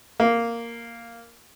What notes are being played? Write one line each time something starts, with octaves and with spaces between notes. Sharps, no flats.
A#3